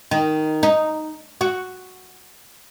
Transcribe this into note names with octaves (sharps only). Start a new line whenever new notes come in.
D#3
D#4
F#4